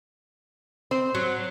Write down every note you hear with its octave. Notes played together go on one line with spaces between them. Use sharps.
C4 C5
F#3